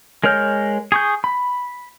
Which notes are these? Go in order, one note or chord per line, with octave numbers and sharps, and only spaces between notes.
G#3 A#4 C#5 F6 G6
G#4 C#6 G6
B5